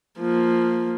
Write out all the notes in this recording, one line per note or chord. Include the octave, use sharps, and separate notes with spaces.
F3 A#3